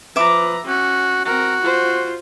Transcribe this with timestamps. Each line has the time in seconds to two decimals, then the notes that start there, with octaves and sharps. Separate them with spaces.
0.16 F3 B4 E5 A#5 D6
0.65 C#4 F#4
1.25 C4 F#4 A#4
1.61 F4 C5